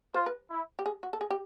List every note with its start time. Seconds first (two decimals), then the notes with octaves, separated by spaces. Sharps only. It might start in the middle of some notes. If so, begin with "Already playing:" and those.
0.14 F4 C5
0.26 B4
0.50 E4
0.79 G4
0.86 G#4
1.03 F#4
1.13 A4
1.21 G#4
1.30 G4